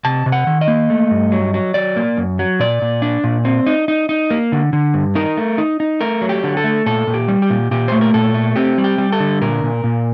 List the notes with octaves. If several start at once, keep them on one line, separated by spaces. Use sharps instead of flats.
C3 A5
C3
F#5
D#3
D#5
A#3
A3
G2
F#3
F#3
F#3 D5
A#3
F#2
F#3
A#2 D5
A#2
D4
A#2
C4
D#4
D#4
D#4
A#3
D3
D3
G2
D#4 A#4
A3
D#4
D#4
A3 A#4
F#3
G4
D3
A4
A3
A#2 A4
A#2
G4
G3
G4
A#2
A#2 G4
A3 C5
A#4
A#2 A4
A3
C4 G4
G3
G4
G3
A4
D3
A#2 A#4
A#2
A#2